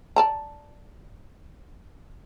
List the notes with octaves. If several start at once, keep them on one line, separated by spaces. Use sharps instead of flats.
D5 A5 A#5